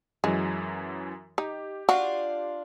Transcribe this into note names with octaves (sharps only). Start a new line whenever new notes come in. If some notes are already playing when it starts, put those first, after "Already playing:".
F#2 E3 F#3 G#3
D#4 G4
D4 F4 F#4